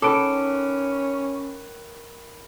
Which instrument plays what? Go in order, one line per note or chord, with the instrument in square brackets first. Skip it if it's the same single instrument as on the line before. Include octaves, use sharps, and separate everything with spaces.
[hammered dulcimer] D#3 B4 C#5 [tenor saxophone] C#4 [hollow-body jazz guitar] A4 [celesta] D6 D7